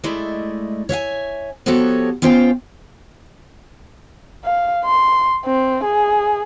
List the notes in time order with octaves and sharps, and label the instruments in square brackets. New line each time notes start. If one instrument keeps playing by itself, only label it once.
[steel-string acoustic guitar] G#3 A3 E4 D5 D#5
C#5 E5 F5 G#5
F3 B3 F#4 G4 A4 C#5
B3 C#4 F4 C5 F5 G5
[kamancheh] F5
C6
C4
G#4